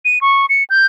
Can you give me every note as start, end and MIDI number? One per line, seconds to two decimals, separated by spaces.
0.05 0.19 99
0.21 0.46 85
0.49 0.64 97
0.70 0.86 91